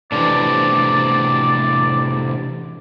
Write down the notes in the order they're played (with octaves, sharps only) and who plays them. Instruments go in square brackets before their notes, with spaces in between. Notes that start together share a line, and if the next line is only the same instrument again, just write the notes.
[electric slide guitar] A2 C3 F3 [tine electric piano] E3 D4 [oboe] D5